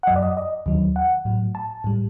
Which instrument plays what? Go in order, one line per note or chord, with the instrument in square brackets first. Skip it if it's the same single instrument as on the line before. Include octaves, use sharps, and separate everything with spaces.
[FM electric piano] F#5
F#2 F#3 D#5
D5
D#5
D#5
D#2 D#3 F#3
F#5
A2 F#3
A5
A2 G3